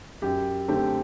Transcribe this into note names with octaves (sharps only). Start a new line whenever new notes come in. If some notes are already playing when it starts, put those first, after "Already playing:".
F#2 G4
D3 A3 C4 G4